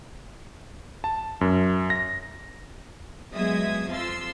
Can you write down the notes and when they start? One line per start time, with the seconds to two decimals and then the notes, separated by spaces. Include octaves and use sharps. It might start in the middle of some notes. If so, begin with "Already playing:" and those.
1.04 A5
1.41 F#2
1.90 A#6
3.31 F#3 G#3 B3 E5 D#6 G#6
3.89 F2 F3 F4 C6 E6 A6